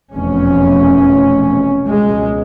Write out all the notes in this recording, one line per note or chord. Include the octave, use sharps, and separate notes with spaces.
F1 E2 B2 C#4
C#2 B2 G#3